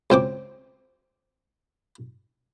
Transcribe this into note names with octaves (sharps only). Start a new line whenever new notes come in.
C#2 C4 G5 D6